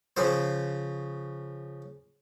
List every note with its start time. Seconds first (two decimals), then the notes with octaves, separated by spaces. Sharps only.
0.17 C#3 F3 C5